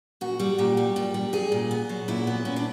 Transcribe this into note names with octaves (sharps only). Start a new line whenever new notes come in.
A#2 F#4
G3
A#2 G4
G3
A#2
G3
A#2 G#4
A#2
B3
F#3
A#2 E4
B3
A#2 C#4
D4